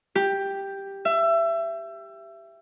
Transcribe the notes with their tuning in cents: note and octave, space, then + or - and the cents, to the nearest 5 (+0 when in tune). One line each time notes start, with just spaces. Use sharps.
G4 +5
E5 +25